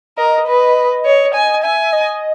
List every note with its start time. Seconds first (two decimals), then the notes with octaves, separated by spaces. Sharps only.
0.17 A#4 D#5
0.47 B4
1.05 C#5
1.35 G#5
1.63 E5 G#5
1.93 D#5